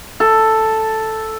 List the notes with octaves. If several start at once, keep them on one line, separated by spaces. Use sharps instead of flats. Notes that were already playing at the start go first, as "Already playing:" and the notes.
A4